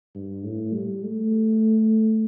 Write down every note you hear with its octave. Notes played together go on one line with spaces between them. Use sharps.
G2
A2
G3
A3